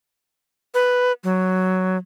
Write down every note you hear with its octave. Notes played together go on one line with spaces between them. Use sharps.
B4
F#3